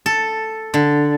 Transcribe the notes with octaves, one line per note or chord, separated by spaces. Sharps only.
A4
D3